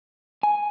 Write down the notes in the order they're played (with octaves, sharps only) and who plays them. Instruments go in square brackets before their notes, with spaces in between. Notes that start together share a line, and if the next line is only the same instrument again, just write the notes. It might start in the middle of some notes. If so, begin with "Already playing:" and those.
[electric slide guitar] G#5